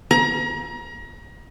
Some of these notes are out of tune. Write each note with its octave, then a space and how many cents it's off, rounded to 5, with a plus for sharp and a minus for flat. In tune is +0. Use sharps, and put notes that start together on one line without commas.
A#5 +35